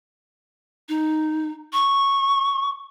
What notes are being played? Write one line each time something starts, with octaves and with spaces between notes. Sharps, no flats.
D#4
C#6